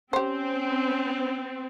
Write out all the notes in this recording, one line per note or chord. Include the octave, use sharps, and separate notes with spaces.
C4 C#4 G4 C5